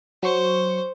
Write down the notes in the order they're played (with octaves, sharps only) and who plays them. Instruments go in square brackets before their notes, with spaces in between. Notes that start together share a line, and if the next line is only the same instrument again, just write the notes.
[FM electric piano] F#3 C#6 C#7 [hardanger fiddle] C5